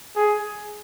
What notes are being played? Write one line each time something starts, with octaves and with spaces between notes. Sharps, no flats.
G#4